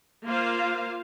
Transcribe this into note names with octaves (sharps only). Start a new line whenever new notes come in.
A#3 F4 C5 F5